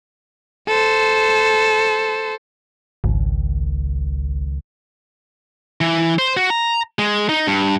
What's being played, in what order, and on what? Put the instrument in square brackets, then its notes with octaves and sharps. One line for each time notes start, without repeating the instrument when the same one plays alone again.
[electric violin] A4 C5
[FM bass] G#1 [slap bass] C#2 D#3
[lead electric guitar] E3
C5
F#4
A#5
G#3
D#4
G2